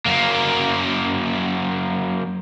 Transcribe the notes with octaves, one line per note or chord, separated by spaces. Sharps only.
F#2 A#3